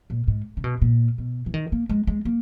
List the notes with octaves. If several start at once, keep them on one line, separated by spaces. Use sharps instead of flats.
A#2
G#2
C#3
B2
A#2
B2
E3
D#3
A#3
G#3
G#3
A#3